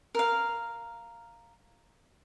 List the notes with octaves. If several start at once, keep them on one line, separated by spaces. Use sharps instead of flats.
A#4 F5